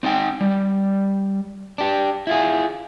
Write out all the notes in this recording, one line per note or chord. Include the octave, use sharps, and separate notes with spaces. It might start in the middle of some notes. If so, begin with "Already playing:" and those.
C4 D#4 D#5 G5
G3
D4 G4
E4 F4 G#4